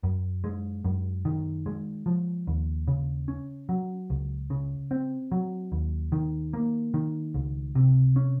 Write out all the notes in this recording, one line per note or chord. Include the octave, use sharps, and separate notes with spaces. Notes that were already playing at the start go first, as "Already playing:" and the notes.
F#2
G#3
F#2
D#3
G#3
F3
D#2
C#3
C#4
F#3
C#2
C#3
C4
F#3
D#2
D#3
A#3
D#3
C#2
C3
C#4